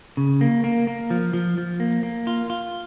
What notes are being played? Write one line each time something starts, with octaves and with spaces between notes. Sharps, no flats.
C#3
A#3
A#3
A#3
F3
F3
F3
A#3
A#3
F4
F4